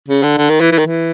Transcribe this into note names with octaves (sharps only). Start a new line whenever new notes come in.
C#3
D3
D3
D#3
E3
E3
D#3
E3